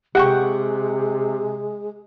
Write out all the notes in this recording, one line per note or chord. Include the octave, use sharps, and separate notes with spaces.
C3 G#3 G4 F#5 G5 C#6